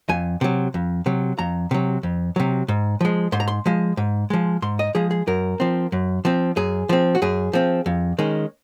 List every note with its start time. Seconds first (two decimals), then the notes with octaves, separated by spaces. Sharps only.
0.09 F2 G#5
0.41 C3 F#3
0.74 F2
1.06 C3 F#3
1.39 F2 A#5
1.71 C3 F#3
2.03 F2
2.36 C3 F#3
2.68 G#2
3.01 F3 G#3
3.32 G#2 C6
3.40 A#5
3.48 C6
3.66 F3 G#3
3.97 G#2
4.30 F3 G#3
4.62 G#2 C6
4.79 D#5
4.95 F3 G#3 G#4
5.11 G#4
5.27 F#2 A#4
5.60 F3 C4
5.92 F#2
6.25 F3 C4
6.56 F#2 G#4
6.89 F3 C4
7.15 F#4
7.22 F#2 G#4
7.53 F3 C4
7.86 F2
8.18 D#3 G#3 C#4